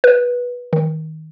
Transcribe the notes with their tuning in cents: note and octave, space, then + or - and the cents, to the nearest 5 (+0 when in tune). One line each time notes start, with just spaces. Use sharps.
B4 -15
D#3 +20